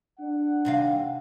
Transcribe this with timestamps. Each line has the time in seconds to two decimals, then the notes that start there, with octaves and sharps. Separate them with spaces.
0.20 D4 F#5
0.65 D#2 C3 F5